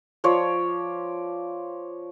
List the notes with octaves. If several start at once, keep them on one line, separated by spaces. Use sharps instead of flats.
F3 C#5 D5